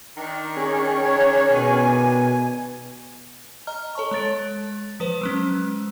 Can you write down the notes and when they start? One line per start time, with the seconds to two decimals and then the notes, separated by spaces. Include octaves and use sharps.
0.18 D#3 D4
0.56 C#4 G#4
1.00 C#5
1.52 B2 G#5
3.67 D#5 A#5 F6
3.95 A4 C#5 A5 C#6
4.11 G#3 C#5 A6 D7
5.00 F3 B4 C5
5.21 F#3 G#3 C#4